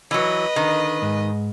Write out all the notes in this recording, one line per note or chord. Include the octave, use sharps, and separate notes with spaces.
E3 F#3 B4 D#5
D3 D#3
G#2